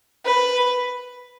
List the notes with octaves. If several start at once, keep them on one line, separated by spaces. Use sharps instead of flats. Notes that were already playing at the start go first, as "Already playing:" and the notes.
B4